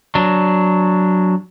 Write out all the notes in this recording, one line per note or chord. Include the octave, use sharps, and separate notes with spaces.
F#3 D4